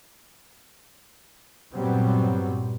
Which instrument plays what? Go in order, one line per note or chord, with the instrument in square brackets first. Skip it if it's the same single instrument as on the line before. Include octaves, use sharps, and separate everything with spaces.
[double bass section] G2 A#2 F#3 G3 B3 C4